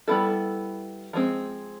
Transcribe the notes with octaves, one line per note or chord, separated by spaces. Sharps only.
G3 B3 E4 A4
F3 G#3 C4